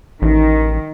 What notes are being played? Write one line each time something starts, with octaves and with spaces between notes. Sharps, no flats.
A1 D#3